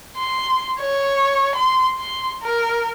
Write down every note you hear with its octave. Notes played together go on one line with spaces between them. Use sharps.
C6
C#5
C6
C6
A#4